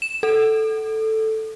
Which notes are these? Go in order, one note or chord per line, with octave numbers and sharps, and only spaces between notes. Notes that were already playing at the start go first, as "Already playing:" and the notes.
E7
A4